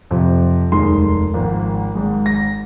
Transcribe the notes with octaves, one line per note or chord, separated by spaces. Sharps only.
F2 C3 F3
F1 D#2 D#3 G#3 C6
G#1 G#2 F3 A#3
G#1 G#2 G#3
A#6